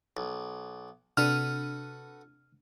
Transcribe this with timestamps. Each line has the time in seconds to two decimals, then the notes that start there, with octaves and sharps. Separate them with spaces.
0.17 B1
1.17 C3 D4 F#4 A4 B4 F6 D#7